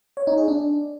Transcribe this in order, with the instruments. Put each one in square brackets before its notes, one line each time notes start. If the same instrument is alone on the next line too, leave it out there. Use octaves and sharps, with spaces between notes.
[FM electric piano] C#5
D#4
G#4
D4